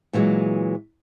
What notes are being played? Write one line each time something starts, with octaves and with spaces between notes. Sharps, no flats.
A#2 E3 F#3 G#3